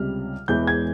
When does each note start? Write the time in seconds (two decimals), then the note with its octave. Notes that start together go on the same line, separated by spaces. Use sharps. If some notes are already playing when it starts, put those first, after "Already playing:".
Already playing: C#2 C3 G3 F6
0.48 E1 E2 E3 G#3 G6
0.67 G#6